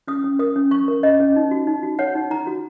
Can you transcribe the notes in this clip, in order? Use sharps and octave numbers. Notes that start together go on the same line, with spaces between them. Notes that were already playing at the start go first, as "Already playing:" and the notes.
C#4 D#6
C#4
A#4 D#6
C#4
C#4 C#6
A#4
C#4 D#5
C#4
D#4
F#4
D#4
F#4
C#5 F#5
D#4
D#4 A#5
F#4